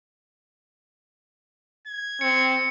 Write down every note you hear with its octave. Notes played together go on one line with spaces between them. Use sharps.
G#6
C4 C#7